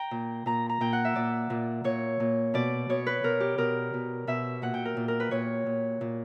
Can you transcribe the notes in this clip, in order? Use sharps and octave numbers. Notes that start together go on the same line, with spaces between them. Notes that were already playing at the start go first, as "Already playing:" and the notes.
Already playing: G5 A#5
A#2
A#2 A#5
A#5
A#2 G5
F#5
E5
A#2 D5
A#2
A#2 C#5
A#2
B2 D5
B2 C#5
B4
B2 A#4
G4
B2 A#4
B2
B2 E5
A#2 F#5
G5
A#4
A#2
A#4
B4
A#2 C#5
A#2
A#2